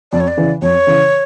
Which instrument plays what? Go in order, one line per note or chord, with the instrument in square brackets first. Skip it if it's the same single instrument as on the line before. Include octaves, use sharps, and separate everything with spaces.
[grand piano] F2 [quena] D5
[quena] C#5
D5
[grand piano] C#3 E3
[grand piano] F2 [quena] C#5
[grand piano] C#3 E3